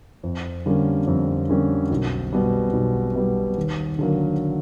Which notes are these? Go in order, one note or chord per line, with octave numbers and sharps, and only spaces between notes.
F2
D3 G3 A#3 C#4
F2
D3 G3 A#3 C#4
B1
B2 G3
B1
B2 G3
D#2
D3 F#3 A#3